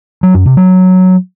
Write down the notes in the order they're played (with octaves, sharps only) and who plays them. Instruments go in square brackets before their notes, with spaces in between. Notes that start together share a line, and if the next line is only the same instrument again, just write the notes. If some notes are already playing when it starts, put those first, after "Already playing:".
[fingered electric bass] F#3
F#2
C3
F#3